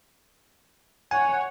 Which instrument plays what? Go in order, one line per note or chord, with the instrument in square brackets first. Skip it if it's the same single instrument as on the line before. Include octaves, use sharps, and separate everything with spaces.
[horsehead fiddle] C#5 F#5 [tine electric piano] G#5